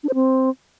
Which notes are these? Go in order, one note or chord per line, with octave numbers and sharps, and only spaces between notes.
D4
C5
C4